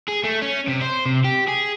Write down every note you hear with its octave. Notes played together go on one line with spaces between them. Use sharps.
G#4
A3
C#4
C3
C5
C3
G4
G#4